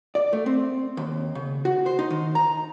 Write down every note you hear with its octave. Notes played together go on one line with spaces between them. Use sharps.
D5
A3
C4
D#2
C#3
F#4
C5
D#4
D#3
A#5